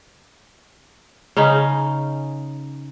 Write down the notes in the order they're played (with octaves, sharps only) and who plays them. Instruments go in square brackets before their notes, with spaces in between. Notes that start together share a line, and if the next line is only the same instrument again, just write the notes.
[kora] C#3 C#4 D#4